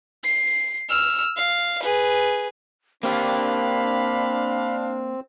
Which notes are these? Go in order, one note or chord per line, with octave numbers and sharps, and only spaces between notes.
C7
E6 F6
F5
G#4 B4
A#3 C4 D4 G4 F5 B5